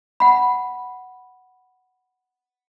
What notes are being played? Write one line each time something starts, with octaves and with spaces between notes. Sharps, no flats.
F#5 B5